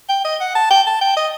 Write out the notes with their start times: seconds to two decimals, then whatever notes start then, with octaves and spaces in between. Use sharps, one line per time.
0.09 G5
0.25 D#5
0.40 F#5
0.55 A5
0.70 G5
0.86 A5
1.01 G5
1.17 D#5